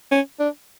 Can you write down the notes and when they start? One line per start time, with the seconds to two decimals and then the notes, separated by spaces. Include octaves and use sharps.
0.11 C#4
0.39 D4